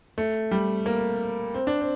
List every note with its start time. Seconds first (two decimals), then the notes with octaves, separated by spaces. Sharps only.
0.18 A3
0.51 G3
0.86 A#3
1.54 C4
1.67 D4
1.81 C4